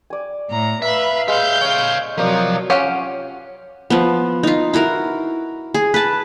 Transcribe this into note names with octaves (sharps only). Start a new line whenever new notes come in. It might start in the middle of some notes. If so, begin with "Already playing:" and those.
D5 G#5
A2 A#5
B4 E5 F5 B5
G#3 E5 F5 G6
C#5 F5
C3 F3 F#3 A#4 D5
C#4 F4 G4 F5 F#5
F3 B3
D#4 F4
E4 F#4 A#4
G#4
B4 A5